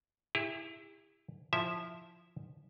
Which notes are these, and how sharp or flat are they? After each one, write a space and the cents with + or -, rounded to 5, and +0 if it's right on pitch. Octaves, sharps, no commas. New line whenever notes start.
E4 +0 G4 +45
F3 +0 E4 +0 E5 -5